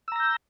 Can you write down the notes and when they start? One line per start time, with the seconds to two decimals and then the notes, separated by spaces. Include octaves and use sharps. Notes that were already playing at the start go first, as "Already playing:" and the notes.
0.08 E6
0.12 A#5
0.16 A#6
0.20 G6